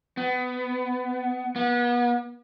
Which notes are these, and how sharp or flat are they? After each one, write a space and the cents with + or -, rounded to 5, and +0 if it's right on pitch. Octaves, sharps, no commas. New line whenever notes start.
B3 +20
B3 -30